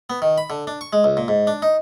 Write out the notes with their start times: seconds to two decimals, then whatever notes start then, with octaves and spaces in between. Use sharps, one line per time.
0.10 B3
0.22 D#3
0.38 B5
0.50 D3
0.67 D4
0.81 C#6
0.93 G#3
1.04 C#2
1.17 A#2
1.28 G#2
1.47 D4
1.62 D#4